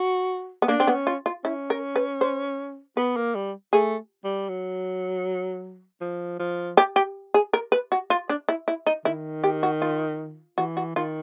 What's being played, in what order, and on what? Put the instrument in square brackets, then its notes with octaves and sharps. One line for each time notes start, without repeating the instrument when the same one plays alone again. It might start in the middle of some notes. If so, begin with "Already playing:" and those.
Already playing: [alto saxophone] F#4
[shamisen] B3
[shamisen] A#3 [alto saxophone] D4
[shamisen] C4
B3
[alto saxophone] C#4
[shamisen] F4
F4
[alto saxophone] C#4 [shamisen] E4
[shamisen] A#4
B4
C5
[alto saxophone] B3 [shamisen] B4
[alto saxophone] A#3
G3
[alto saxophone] A3 [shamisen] G#4
[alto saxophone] G3
F#3
F3
F3
[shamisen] G4
G4
G#4
A#4
B4
F#4
F4
D4
E4
E4
D#4
[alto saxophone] D#3 [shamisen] E4
[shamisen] G4
F#4
F4
[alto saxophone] E3 [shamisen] F#4
[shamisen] F#4
[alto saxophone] D#3 [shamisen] F4